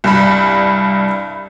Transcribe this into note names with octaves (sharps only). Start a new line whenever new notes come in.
C2 G2 B5